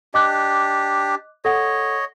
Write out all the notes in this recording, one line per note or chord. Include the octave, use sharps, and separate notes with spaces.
D4 G4 D#5 D6 F#6
A4 C#5 D#5 F#5